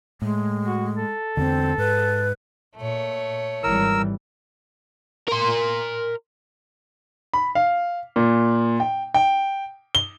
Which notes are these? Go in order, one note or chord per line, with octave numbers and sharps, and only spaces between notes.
A2 G#3
F#4
A4
E2 D3 C4
G#2 B4
A#2 A3 C#5
G#1 E3 G3 A#4 E6
A#4 C6
B5
F5
A#2
G5
G5
G7